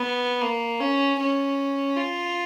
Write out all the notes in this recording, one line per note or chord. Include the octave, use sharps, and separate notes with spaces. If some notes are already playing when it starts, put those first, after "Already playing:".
Already playing: B3
A#3
C#4
C#4
F4